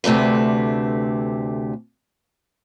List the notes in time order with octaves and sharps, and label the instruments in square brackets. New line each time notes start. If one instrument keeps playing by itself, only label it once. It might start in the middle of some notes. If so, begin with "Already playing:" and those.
[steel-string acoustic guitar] D2 C3 A3 D4 B4